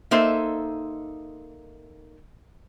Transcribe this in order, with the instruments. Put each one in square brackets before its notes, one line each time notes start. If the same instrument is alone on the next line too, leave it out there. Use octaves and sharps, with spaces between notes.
[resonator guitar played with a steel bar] A#3 D#4 A4 C5 E5